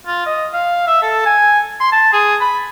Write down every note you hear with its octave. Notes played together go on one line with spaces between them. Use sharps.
F4
D#5
F5
E5
A4
G#5
C6
A5
G#4
B5